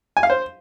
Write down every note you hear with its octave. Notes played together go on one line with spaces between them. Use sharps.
G#5
F5
C5